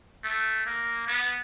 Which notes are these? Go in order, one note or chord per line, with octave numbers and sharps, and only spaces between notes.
A3
A#3
B3